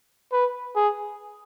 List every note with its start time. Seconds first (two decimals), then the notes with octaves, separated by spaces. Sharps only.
0.33 B4
0.76 G#4